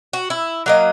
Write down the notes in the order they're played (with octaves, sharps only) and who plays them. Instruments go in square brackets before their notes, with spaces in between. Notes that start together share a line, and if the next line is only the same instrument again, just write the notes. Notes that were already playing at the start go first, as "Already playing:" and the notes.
[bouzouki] F#4
E4
F#3 A#3 D#5